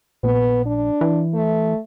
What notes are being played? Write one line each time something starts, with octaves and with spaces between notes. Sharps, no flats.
A#1 B3
D4
E3
A3